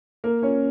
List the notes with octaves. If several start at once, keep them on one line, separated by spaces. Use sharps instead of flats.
A#3 A#4
C#4 C#5